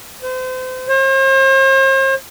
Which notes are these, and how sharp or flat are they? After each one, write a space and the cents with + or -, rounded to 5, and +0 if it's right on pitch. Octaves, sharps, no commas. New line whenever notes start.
C5 -35
C5 +45